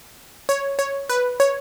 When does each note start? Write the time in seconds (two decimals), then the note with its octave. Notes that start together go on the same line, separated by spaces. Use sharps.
0.49 C#5
0.79 C#5
1.09 B4
1.40 C#5